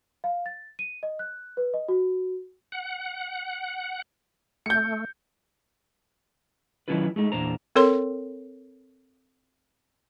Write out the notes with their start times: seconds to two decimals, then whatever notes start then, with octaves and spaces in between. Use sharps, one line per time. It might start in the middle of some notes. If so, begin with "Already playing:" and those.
0.24 F5
0.46 A6
0.79 D#7
1.03 D#5
1.19 F#6
1.57 B4
1.74 D#5
1.88 F#4
2.72 F#5
4.66 A3 G6 C#7
6.88 D#3 F#3 C#4 E4 F4 B4
7.16 G#3 A3 D#4
7.32 E2 A#2 D4 C5 A#5
7.76 C4 A4 A#4 C#5 C6